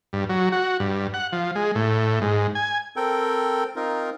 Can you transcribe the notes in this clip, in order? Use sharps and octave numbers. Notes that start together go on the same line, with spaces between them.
G2
F#3
F#4
G2
F#5
F3
G#3
A2
G#2
G#5
C4 A4 A#4 G5
C4 D#4 F4 A#4